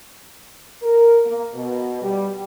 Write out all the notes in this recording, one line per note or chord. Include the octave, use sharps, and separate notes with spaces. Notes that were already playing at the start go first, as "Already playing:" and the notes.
A#4
A#3
B2
G3